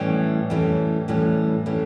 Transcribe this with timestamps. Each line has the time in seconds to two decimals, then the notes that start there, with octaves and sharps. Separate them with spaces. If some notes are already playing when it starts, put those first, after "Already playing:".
Already playing: A2 E3 G3 C#4
0.50 A2 E3 G3 C#4
1.08 A2 E3 G3 C#4
1.66 A2 E3 G3 C#4